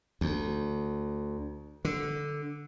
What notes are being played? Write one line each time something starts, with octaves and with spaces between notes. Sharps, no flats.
D2
D3